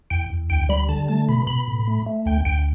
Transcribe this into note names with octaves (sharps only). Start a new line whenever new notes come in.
E2 G5
E2
D2 G5
G3 B5
D3 A5
A3 A5
B2 B5
B2 B5
A2
A3
A3
D2 G5
D2 G5